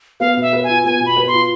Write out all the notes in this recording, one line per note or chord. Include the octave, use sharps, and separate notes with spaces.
B3 F5
B2 E5
B4
G#5
F4
B3 G#5
B2
B5
B4
C6
F4